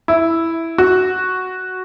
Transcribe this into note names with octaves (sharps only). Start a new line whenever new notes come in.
E4
F#4